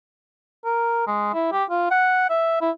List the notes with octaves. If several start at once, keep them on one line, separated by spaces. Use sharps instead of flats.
A#4
G#3
E4
G4
F4
F#5
E5
E4